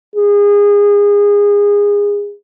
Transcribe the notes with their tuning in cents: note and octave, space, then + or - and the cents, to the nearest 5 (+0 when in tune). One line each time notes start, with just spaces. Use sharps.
G#4 -25